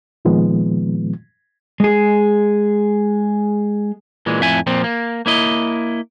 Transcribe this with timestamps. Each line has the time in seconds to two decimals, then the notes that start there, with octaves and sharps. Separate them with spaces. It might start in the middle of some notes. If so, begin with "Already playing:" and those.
0.25 A#2 D#3 F3 G#3 B3
1.80 G#3 G#4
4.26 A#2 E3 G#3
4.40 F2 A2 E5 G#5
4.67 A#2 F3 C4
4.84 A#3
5.26 A#3 E4 D#5